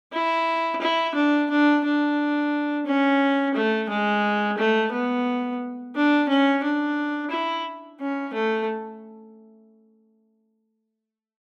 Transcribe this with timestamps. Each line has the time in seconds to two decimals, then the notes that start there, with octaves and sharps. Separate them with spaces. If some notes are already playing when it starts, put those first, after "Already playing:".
0.13 E4
0.81 E4
1.15 D4
1.50 D4
1.84 D4
2.86 C#4
3.54 A3
3.89 G#3
4.58 A3
4.92 B3
5.95 D4
6.28 C#4
6.63 D4
7.31 E4
8.00 C#4
8.33 A3